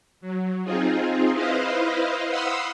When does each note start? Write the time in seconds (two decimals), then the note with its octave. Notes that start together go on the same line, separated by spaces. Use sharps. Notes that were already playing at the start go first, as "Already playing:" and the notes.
0.21 F#3
0.64 C4 D#4 F4 G#4
1.31 E4 B4 C5 D#5 F5
2.28 F5 F#5 B5 C6 D#6 E6